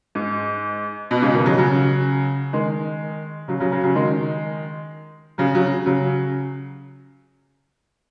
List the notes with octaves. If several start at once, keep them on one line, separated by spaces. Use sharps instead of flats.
G#2
B2
G#2 C#3
B2 D#3
C#3 F#3
C#3 F#3
D#3 G#3
C#3 F#3
C#3 F#3
C#3 F#3
C#3 F#3
D#3 G#3
C#3 F#3
C#3 F#3
C#3 F#3